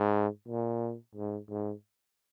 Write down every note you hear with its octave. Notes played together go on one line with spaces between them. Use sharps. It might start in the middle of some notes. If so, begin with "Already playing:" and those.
Already playing: G#2
A#2
G#2
G#2